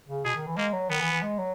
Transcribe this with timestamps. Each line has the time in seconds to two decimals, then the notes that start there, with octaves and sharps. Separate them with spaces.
0.08 C#3
0.25 B2 G#4
0.35 D#3
0.46 E3
0.57 G#3 A#3
0.73 F#3
0.90 D#3 B3
1.00 E3
1.11 E3
1.22 G#3
1.39 F#3